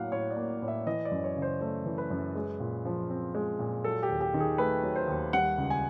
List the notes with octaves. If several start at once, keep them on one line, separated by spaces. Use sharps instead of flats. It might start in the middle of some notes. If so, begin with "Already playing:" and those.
Already playing: A2 F#3 A#3 F5 F#5
A2 C#5
D5
A#3
A2
E5
E3 D#5
D5
F#2
C#5
C#3
C5
A3 C5
E3
B4
F#2
G#3
A#2
F3
C4
G#3
A#2
F#3 A4
G4
D#2
G4
D#3
G#4
A3 B4
F#3
C5
D#2
G3 F#5
C#2
G#5